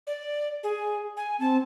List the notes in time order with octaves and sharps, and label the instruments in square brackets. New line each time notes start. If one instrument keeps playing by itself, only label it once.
[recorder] D5
G#4
G#5
[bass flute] C4 [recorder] A5